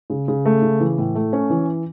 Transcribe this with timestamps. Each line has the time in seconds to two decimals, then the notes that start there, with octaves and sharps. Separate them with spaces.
0.10 C#3
0.28 C#3
0.45 A3
0.62 C#3
0.80 E3
0.98 A2
1.15 A3
1.33 C#4
1.50 E3